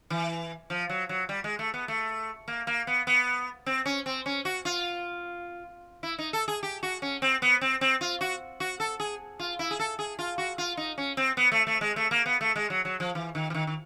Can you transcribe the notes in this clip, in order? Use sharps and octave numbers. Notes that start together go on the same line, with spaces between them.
E3
F3
F#3
F#3
G3
G#3
A3
B3
A3
A#3
A#3
B3
B3
C4
C#4
C4
C#4
F#4
F4
E4
D#4
A4
G#4
G4
F#4
C#4
C4
B3
C4
C4
F4
F#4
F#4
A4
G#4
F4
E4
G#4
A4
G#4
F4
F#4
F4
D#4
C#4
C4
B3
A3
A3
G#3
A3
A#3
B3
A3
G#3
F#3
F#3
F3
E3
D#3
E3
D#3
D#3